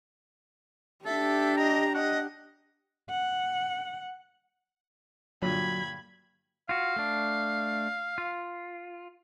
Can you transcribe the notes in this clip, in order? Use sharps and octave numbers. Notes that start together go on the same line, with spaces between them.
D4 G4 A4 E5
D#5 A#5
D#5 F#5
F#5
G2 A#2 D3 F#3 B5 G#6
F4 F#4 F5
A3 D4
F4